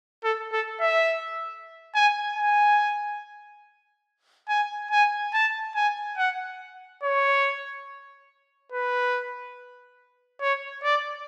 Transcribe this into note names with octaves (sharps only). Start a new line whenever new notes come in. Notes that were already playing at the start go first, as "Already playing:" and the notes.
A4
A4
E5
G#5
G#5
G#5
G#5
A5
G#5
F#5
C#5
B4
C#5
D5